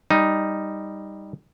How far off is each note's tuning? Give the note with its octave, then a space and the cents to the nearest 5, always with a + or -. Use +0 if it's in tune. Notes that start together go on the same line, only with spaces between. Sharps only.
G3 +10 D#4 +0